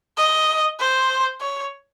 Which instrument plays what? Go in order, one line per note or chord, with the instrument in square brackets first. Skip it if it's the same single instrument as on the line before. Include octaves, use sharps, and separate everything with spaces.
[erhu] D#5
C5
C#5